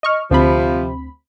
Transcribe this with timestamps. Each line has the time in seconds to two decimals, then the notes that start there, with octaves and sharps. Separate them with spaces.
0.03 D#5 C#6 F6
0.31 D2 C3 F3 C4 B5